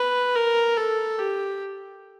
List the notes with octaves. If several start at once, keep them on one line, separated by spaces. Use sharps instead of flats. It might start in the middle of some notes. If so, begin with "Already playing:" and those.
Already playing: B4
A#4
A4
G4